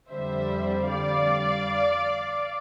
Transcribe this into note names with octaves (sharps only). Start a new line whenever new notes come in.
F2 D3 G3 C5 E5
D5 F5